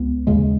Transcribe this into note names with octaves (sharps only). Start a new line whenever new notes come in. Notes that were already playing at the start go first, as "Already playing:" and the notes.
Already playing: C#2 B3
D#2 C#3 G#3